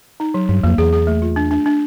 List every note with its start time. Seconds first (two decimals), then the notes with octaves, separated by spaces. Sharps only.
0.20 D#4
0.34 F#3
0.49 G2 F#3
0.64 F2 A#3
0.78 E2 G#4
0.93 G#4
1.07 A3
1.22 F4
1.36 D4
1.51 D4
1.66 D4